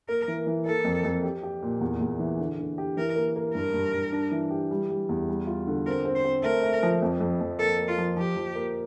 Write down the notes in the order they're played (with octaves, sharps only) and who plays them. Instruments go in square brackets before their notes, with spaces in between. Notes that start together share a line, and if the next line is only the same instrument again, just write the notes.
[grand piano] A#3 [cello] A#4
[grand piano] E3
E3
[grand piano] A#3 [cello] A4
[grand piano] F2
F2
G4
G4
A#2
E2
E2
E3
D3
D3
G4
[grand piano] E3 [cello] A#4
[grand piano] A#3
A#3
[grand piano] G2 [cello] A#4
[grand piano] G2
G2
D4
E3
G4
G3
G3
E2
G3
F4
D3
[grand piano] C4 [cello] A#4
[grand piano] C4
[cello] C5
[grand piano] C4
[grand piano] A3 [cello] A#4
[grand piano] A3
F3
F2
F2
F2
[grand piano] A#3 [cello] A4
[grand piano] A#3
[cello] F4
[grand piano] F3
[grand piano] F3 [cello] G4
[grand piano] F3
A#3